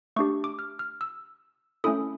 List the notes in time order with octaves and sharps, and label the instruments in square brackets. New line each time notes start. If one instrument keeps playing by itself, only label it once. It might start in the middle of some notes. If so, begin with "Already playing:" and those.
[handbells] A3 D4 G4 C#6
D6
F6
F6
E6
A3 C#4 E4 A4 D#6